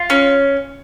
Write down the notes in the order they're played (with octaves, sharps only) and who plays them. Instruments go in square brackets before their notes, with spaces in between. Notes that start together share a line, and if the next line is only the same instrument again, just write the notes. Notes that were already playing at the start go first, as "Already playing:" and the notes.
Already playing: [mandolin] F4
C#4